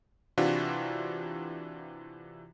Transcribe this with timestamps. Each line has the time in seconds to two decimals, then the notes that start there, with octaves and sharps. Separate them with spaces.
0.38 C3 E3 D4 F4 F#4